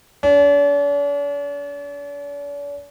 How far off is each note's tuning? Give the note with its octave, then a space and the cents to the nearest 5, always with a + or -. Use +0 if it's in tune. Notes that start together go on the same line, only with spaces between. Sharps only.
D4 -45